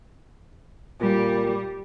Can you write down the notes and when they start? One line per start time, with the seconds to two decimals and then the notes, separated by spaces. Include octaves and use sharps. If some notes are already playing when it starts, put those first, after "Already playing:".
1.01 A#2 G3